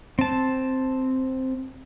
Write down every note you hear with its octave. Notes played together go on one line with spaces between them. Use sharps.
C4 A5